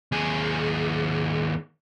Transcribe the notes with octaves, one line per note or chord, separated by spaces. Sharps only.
D#2 G#4